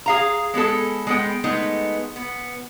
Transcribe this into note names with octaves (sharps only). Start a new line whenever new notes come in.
G#4 F5 A#5
G#3 B3 G#4 A4
G#3 B3 G5
G#3 A3 B3 D#4
B3